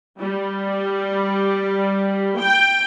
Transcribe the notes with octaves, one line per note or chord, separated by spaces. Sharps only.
G3
G5